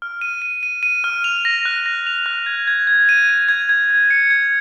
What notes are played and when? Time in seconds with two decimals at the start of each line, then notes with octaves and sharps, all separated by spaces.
0.02 F6
0.21 D#7
0.42 D#7
0.63 D#7
0.83 D#7
1.04 F6
1.24 F7
1.45 A#6
1.65 F#6
1.86 A#6
2.07 F7
2.26 F#6
2.46 G#6
2.67 G#6
2.87 G#6
3.09 D#7
3.29 D#7
3.49 G#6
3.69 G#6
3.90 G#6
4.10 C#7
4.30 G#6